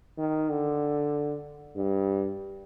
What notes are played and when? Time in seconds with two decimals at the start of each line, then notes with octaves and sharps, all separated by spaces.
0.18 D#3
0.50 D3
1.76 G2